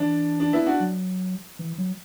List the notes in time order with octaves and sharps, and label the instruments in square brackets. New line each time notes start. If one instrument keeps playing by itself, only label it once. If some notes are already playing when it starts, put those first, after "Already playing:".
Already playing: [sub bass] E3 [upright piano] D4
[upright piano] D4
B3 E4
D4 F#4
[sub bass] F#3
E3
F#3